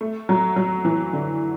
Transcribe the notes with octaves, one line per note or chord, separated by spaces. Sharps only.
A3
F#3
F#3
E3
D3